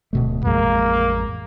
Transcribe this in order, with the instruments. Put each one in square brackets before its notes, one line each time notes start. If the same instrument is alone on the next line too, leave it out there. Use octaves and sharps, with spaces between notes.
[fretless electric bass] D1 B2 A3
[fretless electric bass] A1 F2 G#3 [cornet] A#3